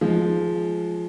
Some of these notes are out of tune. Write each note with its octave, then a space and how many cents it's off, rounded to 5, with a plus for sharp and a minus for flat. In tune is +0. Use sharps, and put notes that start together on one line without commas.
F3 +0 G#3 +15